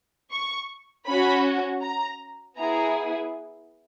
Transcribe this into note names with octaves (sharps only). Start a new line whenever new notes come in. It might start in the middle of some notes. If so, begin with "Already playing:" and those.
C#6
C#4 F#4 B5
A#5
B3 E4 G#4 A#5